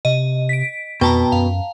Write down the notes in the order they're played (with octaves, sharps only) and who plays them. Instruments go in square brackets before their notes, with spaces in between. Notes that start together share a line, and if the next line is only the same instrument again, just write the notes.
[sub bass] C3 [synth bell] D#5
[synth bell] B6 D7
[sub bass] F2 [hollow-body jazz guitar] B2 [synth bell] G5 A5 A#5
[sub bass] F#2 [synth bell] F5